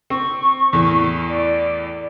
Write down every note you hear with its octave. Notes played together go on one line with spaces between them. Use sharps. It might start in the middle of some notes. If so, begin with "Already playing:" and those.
C4 C#6
E2 A2
D5